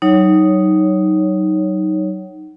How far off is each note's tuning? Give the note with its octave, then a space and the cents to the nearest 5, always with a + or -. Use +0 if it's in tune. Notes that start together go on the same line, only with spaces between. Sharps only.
F#3 +35 D#4 +0 C#5 +0